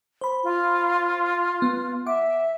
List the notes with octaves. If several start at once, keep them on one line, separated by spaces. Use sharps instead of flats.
C5 B5
F4
B3
E5 F#5 D6